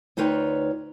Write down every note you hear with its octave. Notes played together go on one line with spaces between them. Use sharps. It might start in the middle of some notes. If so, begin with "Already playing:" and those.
D2 D#4 F4 B4 C#5 G5